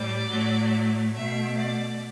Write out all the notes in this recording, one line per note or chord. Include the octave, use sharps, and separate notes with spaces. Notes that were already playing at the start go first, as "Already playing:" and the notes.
Already playing: A2 G3 D5
A2 F#3 A3
B2 A3 E5
D5